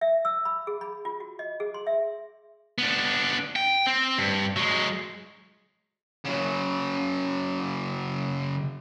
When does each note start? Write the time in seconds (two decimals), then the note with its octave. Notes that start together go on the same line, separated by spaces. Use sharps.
0.01 E5
0.25 E6
0.45 B5
0.67 G#4
0.81 B5
1.05 F4
1.20 F#4
1.39 D#5
1.60 G#4
1.74 C6
1.87 E5
2.78 B3 D4
3.56 G5
3.87 C4
4.18 G2
4.56 F#3 G#3
6.25 C#3 F#3